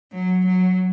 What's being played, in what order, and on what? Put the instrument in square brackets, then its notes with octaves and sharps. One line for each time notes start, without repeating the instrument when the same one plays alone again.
[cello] F#3
F#3